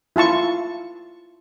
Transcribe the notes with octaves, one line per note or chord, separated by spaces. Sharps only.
E4 F4 A5 C#6